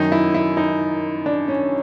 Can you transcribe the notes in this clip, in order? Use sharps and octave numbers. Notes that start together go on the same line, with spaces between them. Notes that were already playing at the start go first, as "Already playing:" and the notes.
Already playing: F#2 D#3 F#3 D#4
E4
E4
D#4
D4
C#4